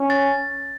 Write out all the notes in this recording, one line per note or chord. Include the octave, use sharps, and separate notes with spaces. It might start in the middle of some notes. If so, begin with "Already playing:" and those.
Already playing: C#4
A6